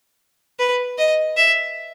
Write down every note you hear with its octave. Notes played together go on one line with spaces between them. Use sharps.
B4
D#5
E5